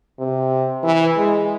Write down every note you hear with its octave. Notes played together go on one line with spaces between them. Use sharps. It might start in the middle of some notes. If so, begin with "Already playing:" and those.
C3
E3
G#3